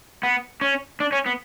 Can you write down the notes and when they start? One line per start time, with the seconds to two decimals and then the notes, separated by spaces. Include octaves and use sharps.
0.23 B3
0.61 C#4
1.00 D4
1.12 C#4
1.26 B3